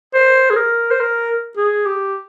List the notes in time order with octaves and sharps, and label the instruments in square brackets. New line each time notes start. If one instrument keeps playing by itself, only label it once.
[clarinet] C5
G#4
A#4
C5
A#4
G#4
G4